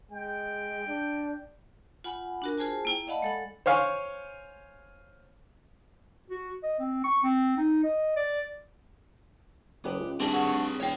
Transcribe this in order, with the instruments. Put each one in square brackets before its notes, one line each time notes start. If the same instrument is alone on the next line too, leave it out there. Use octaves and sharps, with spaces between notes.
[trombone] G#3 [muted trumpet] G5
[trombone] D4
[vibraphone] F4 F#5 G#5 B5
D4 F#4 A#4
F4 G#4 C5 G#5 A5
A#3 E4 G5
D5 D#5 F5 F#5 A5 B5
G#3 A4 F#5
[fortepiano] C5 C#5 F5 G#5
[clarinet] F#4
D#5
C4
C#6
C4
D#4
D#5
D5
[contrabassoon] F#1 [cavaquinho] G4 B4 D#6
[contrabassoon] C#2
[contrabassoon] G2 [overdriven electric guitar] C4 G#4 [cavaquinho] E4 D5 A5
[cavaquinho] F#4 A4 C#5
[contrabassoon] E1 [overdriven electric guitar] C#5 G5 [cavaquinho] F5